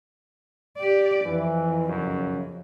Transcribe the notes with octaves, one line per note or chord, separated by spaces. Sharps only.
G4 D5
F2 E3
B1 F#2 C#3